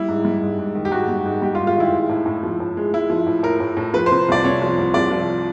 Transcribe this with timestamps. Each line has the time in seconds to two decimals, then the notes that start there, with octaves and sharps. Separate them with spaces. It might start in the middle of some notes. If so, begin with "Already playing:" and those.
Already playing: G3 E4
0.09 G#2
0.25 G3
0.42 G#2
0.59 G#2
0.75 D#3
0.85 G4
0.91 G#2 F#4
1.09 G3
1.26 G#2
1.42 G3 G4
1.55 F4
1.59 G#2
1.67 F4
1.76 D#3 E4
1.93 G#3
2.09 A2
2.26 A2
2.43 F3
2.60 A2
2.77 G#3
2.94 G#3 E4
3.10 F3
3.27 A2
3.43 A2 A#4
3.60 A2
3.77 A2
3.94 F3 B4
4.06 C5
4.11 C3
4.28 C2 D5
4.44 C3 C#5
4.62 F3
4.77 C2
4.94 C2 D5
5.11 F3